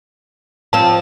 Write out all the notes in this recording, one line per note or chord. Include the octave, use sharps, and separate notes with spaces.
F3 C4 A5